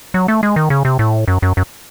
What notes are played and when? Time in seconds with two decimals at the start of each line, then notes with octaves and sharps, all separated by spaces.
0.14 F#3
0.28 A3
0.43 G#3
0.56 D#3
0.70 C#3
0.85 C3
0.99 A2
1.28 F#2
1.42 F#2
1.57 F#2